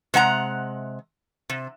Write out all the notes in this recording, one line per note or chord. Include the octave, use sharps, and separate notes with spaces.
C3 G#3 F#5 A#5
C3